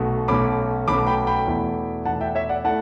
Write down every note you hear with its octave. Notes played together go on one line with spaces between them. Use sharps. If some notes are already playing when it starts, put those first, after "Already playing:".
Already playing: B1 B2 A3
B1 B2 A3 C#4 B5 D6
B1 B2 A3 C#4 B5 D6
G5 B5
G5 B5
E2 B2 A3 E4
E2 B2 A3 E4 F#5 A5
E5 G5
C#5 E5
D5 F#5
A3 E4 F#5 A5